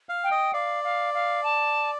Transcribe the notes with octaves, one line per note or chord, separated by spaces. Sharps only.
F5
G5
D#5
D5 F5
F5
F5
A5